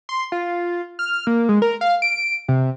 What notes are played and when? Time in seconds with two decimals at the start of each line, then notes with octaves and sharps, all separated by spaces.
0.09 C6
0.32 F4
0.99 F6
1.27 A#3
1.49 G#3
1.62 A#4
1.81 F5
2.02 D7
2.48 C3